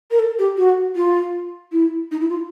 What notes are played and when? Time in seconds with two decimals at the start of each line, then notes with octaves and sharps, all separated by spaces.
0.11 A#4
0.19 A4
0.38 G4
0.57 F#4
0.95 F4
1.72 E4
2.11 D#4
2.20 E4
2.29 F4